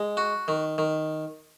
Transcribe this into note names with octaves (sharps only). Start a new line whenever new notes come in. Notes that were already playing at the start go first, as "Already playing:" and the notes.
Already playing: G#3
F#4
D#3
D#3